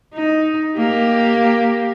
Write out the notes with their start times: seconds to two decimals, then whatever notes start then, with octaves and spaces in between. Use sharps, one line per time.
0.14 D#4
0.77 A#3 G4